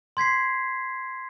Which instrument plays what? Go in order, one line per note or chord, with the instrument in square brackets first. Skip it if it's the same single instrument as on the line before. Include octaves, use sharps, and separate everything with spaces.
[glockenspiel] C6 G#6 B6 C7